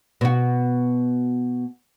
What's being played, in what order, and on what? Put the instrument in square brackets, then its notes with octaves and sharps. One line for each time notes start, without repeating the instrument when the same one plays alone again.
[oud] B2 F#4